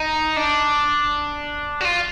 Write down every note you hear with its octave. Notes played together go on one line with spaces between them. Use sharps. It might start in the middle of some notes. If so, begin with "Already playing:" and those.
Already playing: D#4
D4
F#4
F4